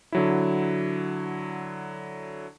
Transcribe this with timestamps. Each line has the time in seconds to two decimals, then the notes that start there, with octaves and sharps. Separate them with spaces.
0.12 D3 F#3 E4